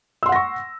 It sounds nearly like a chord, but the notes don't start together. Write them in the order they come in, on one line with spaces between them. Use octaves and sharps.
E6 C6 F#5 A#6 C#6